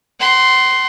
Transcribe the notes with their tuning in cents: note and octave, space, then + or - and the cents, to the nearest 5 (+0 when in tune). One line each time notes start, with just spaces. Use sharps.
F#5 +40 C6 +0